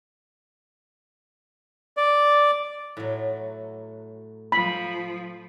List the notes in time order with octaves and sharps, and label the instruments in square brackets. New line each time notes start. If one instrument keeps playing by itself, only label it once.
[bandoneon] D5
[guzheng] A2 F#3
[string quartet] F3 [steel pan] B5